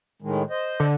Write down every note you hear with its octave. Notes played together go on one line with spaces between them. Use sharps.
A2 D#3 G#3
C5 D#5
D3